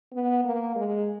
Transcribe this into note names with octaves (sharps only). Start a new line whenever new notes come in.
B3
A#3
G#3